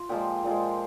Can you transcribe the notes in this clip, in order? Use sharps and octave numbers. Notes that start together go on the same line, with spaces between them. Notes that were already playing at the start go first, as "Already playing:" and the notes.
Already playing: F4
A#2 F3 G#3 G4
A#2 F3 G#3